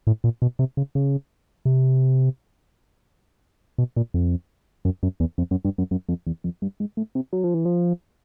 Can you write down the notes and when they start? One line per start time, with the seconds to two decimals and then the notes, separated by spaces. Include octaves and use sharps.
0.07 A2
0.24 A#2
0.42 B2
0.59 C3
0.77 C#3
0.95 C#3
1.65 C3
3.78 B2
3.97 A#2
4.14 F2
4.85 F#2
5.03 F#2
5.20 E2
5.38 F2
5.51 F#2
5.65 G2
5.78 F#2
5.91 F#2
6.09 F2
6.27 E2
6.44 F2
6.62 G2
6.80 G#2
6.97 A2
7.15 C3
7.33 F#3
7.44 F3
7.54 E3
7.65 F3